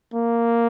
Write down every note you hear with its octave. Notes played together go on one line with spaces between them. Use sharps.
A#3